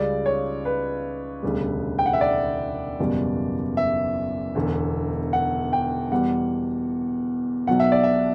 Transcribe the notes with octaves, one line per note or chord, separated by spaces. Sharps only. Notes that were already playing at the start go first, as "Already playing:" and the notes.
Already playing: C#2 C#3 G3 D5
C#5
B4
E1 D2 C#3 G3
G5
F#5
E5
D5
F#1 E2 B2 G3
E5
E1 E2 D3
F#5
G5
E2 B2 G3 F#5
B1 B2 F#3 F#5
E5
D5
E5